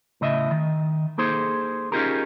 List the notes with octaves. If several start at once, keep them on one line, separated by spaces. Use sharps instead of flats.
A2 C#3 D#5 E5
D#3
A#3 D#4 G#4 A4 C5
C#4 D#4 F4 G4 G#4 A#4